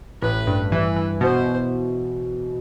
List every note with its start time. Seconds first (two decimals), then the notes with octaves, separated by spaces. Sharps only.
0.22 A1 B4
0.47 G2
0.72 E3 B4
0.96 E3
1.21 B2 C5